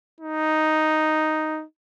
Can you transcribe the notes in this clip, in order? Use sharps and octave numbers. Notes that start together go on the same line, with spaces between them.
D#4